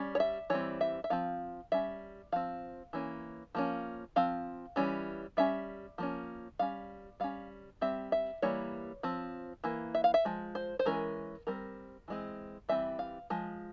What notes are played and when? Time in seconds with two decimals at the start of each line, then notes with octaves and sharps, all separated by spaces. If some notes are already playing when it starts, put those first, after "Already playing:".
Already playing: G3 C#4
0.15 C#5
0.20 E5
0.50 E3 G3 C4 C#5
0.81 E5
1.04 E5
1.10 F3 C4 F5
1.72 G3 C#4 E5
2.32 F3 C4 F5
2.93 E3 A#3 C#4
3.55 F3 A#3 C#4
4.16 F3 C4 F5
4.76 E3 G3 C#4
5.37 G3 C#4 E5
5.98 F3 A#3 C#4
6.59 G3 C#4 F5
7.20 G3 C#4 F5
7.81 G3 C4 E5
8.12 E5
8.42 E3 G3 A#3 C#5
9.03 F3 C4
9.64 E3 A#3
9.95 E5
10.04 F5
10.14 E5
10.25 F3 G#3
10.55 C5
10.79 C5
10.85 E3 G#3 C#4 A#4
11.47 G3 C4 A#4
12.08 E3 G#3 C4
12.69 E3 G3 C4 E5
12.99 F5
13.30 F3 G#3